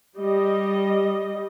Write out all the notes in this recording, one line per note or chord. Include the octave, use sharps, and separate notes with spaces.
G3 D#5